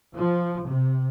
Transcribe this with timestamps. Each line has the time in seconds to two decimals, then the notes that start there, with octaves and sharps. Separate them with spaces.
0.15 F3
0.65 C3